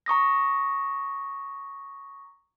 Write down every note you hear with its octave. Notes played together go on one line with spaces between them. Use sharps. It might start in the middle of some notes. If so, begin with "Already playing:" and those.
A#5 C#6 D#6 A#6